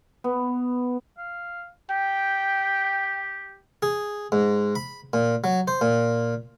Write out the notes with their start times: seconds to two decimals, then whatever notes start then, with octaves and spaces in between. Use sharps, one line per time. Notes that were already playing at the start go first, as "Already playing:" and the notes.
0.24 B3
1.18 F5
1.91 G4 G5
3.82 G#4
4.32 G#2
4.75 B5
5.13 A#2
5.44 F#3
5.68 C5
5.81 A#2